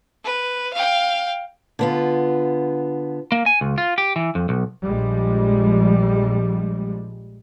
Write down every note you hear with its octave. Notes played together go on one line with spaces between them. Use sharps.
B4
F5 G5
D3 B3 F4
A#3
G#5
C#2
F4
G4
E3
F2
B1
A#1 F3 G3 G#3